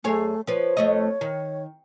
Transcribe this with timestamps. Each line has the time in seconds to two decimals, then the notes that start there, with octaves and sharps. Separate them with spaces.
0.04 F#2 A3 G#4 C#5
0.47 F3 B4 C#5
0.77 F2 A3 D#5
1.21 D#3